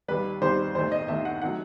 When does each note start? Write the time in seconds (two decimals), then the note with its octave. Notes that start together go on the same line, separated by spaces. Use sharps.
0.08 D#2 D#3 G3 B4
0.42 D#2 D#3 G3 C5
0.75 D#2 D#3 A3 C5
0.92 D#5
1.08 D#2 D#3 A3 E5
1.25 F#5
1.42 D#3 F#3 A3 F#5